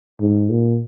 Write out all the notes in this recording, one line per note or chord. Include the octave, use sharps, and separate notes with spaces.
G#2
A#2